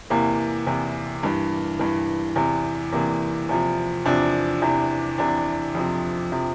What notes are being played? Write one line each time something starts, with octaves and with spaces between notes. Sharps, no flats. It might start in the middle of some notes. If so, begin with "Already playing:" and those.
E2 C3 E3 A#3
E2 C3 E3
G2 E3
G2 E3
E2 C3 E3
E2 C3 E3 A#3
E2 C3 F3
E2 C3 F3 D4
E2 C3 E3
E2 C3 E3 D4
F2 C3 F3
C3 F3